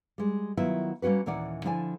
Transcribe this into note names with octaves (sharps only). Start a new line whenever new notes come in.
G3 G#3
D#3 F#3 B3 E4 F4 E5
G3 A#3 C#4 F#4 B4
D#2 A#2 E3 C#4 D5 F#5
D3 F3 E4 D5 G#5